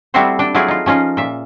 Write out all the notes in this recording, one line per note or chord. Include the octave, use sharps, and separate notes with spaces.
G3 A3 C4 E4 F#4 C5
D4 G5
F#3 A3 E4 F4 G#4 D5
D#4 F4
F3 C#4 D#4 F4
A#2 E5